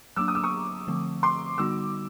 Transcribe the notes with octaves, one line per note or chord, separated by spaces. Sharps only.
F#3 A#3 D4 D6 E6
D#6
D6 E6
C#6 D#6
D3 F3 A3 C4
C6 D6
D3 G3 B3 D#4 F#4 D6 E6